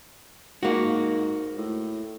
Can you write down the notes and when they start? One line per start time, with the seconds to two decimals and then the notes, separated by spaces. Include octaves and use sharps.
0.63 G#2 A#3 F#4
1.58 A2